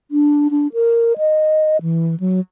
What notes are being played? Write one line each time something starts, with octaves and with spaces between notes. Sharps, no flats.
D4
D4
A#4
D#5
E3
F#3